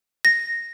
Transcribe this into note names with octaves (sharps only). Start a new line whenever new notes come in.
A#6